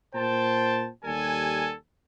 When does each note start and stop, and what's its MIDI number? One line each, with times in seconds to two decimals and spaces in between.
0.15 0.88 46
0.15 0.88 72
0.15 0.88 79
0.15 0.88 81
1.04 1.74 39
1.04 1.74 55
1.04 1.74 69
1.04 1.74 80